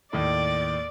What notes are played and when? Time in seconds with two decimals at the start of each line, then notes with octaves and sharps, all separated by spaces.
0.13 D#2 A2 D5